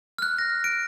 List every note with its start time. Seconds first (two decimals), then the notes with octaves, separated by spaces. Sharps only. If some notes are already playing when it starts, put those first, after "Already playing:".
0.18 F6 F#6
0.38 A#6
0.64 D7